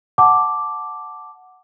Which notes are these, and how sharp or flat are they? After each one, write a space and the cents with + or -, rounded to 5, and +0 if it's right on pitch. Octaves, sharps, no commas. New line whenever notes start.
F#5 +0 A5 +0 D6 +0